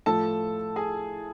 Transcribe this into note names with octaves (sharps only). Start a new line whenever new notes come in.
A2 F3 A3 A4 A5
G#4 G#5